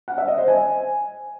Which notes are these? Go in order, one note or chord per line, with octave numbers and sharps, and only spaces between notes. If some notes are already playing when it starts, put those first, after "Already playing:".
F#5
E5
D#5
C5
G#5